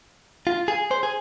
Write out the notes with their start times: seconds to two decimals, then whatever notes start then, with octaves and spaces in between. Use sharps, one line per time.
0.47 F4
0.68 G#4
0.91 C5
1.03 G#4